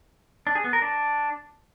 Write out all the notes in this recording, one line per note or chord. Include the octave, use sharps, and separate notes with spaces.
D4
G#4
B3
A#4
D4